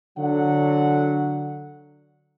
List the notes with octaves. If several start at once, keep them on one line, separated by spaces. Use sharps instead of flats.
D3 F#3 F#5